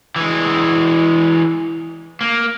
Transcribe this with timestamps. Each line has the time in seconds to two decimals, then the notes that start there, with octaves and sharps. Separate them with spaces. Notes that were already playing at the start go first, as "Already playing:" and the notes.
0.16 E3 G#3
2.21 A#3